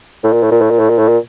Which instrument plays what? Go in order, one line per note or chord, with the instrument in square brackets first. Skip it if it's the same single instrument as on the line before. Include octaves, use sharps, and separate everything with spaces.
[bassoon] A2
A#2
A2
A#2
A2
A#2
A2
A#2
A2
A#2